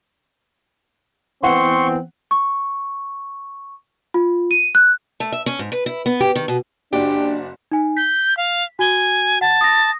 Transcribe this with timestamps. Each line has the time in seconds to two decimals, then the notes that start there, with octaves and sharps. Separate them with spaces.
1.43 E3 B3 C4 F#5 C6 C#6
2.31 C#6
4.14 F4
4.51 D#7
4.75 F#6
5.20 A3
5.32 E5
5.46 C#4
5.59 G#2
5.72 B4
5.86 E4
6.06 B3
6.21 G4
6.36 D#3
6.48 B2
6.93 F#1 D4 F#4 G4 D5
7.71 D#4 G#5
7.97 G6 B6
8.37 F5
8.79 F#4 G#5 G7
9.41 F#5 A5
9.61 D#6 A#6